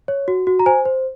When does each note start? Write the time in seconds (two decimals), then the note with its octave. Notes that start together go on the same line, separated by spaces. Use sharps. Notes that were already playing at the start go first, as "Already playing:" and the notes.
0.08 C#5
0.28 F#4
0.47 F#4
0.59 A#5
0.66 C5 G#5
0.85 C5